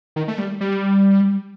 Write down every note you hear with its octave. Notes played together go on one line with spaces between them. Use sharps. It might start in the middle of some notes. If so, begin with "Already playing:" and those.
D#3
A3
G3
G3